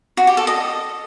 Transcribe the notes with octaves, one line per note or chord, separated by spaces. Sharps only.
F#4
G4
A4
D#5